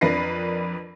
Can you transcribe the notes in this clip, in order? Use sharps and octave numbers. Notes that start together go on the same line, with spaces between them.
F2 D4 A#4 B4 A#6 C7